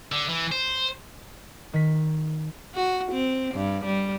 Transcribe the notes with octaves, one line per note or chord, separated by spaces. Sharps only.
D3
E3
C5
D#3 B6
F#4
C4
G2
G3